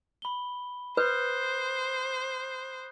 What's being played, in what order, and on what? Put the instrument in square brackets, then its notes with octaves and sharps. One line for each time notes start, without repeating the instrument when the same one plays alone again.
[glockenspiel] B5 G7
[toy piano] B4 [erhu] C5 [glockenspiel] D#6 F#6 G6